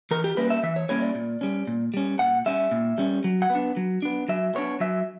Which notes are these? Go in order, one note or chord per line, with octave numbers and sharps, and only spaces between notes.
E3 A#4
G4
G3 A#3 C#4 E4 B4
E5
E3 E5
C#5
G3 A#3 C#4 E4 C#5
D5
A#2
G3 C#4
A#2
G3 C#4
A#2 F#5
G3 C#4 E5
A#2
G3 C#4
F#3
F#5
B3
D4
F#3
B3 D4
F#3 E5
B3 D4 C#5
F#3 E5